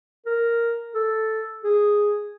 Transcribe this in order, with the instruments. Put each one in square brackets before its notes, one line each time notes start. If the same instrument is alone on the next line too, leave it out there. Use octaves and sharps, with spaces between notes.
[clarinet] A#4
A4
G#4